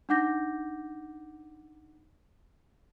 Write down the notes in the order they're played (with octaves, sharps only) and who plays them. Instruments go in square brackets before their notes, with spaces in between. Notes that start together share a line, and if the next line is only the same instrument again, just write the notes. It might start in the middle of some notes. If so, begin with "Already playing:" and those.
[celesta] D4 D#4 F#5 D6 G6 A#6